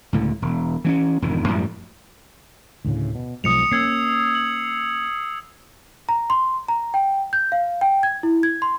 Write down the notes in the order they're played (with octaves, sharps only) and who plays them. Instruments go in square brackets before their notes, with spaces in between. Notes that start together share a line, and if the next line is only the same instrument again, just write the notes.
[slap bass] C#2 A2 D3
E1
E3 C4 C#4
E1 F2 G#2 D#3
F#2 A2 F3 G3
[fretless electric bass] D2 A2 C#3
B2
[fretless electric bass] B1 F3 G#3 [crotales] D#6 C#7 F7
[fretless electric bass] A#3 C#4 [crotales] E6 G#6 C7
[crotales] F#7
[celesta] A#5
C6
A#5
G5
G6
F5
G5
G#6
E4
G#6
C6